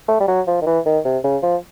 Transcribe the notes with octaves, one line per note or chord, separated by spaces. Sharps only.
A3
G3
F#3
F3
D#3
E3
D#3
C3
C#3
F3